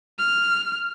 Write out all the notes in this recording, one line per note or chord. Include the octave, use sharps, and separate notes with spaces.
F6